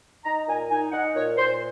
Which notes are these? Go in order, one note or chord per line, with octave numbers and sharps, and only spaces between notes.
D#4 A#5
A#2 G#5
D#4 G#5
D#4 F#5
A#2 C#5
A#2 C5